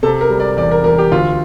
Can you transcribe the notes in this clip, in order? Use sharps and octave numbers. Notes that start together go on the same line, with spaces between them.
C3 A4
A#4
G3
D5
E2 D5
A#4
E2 A#4
G4
D2 F4